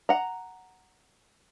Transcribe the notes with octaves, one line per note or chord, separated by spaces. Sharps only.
F#5 A#5